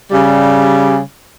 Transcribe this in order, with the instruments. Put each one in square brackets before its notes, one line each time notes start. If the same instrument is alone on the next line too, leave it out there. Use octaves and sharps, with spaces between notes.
[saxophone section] C#3 G3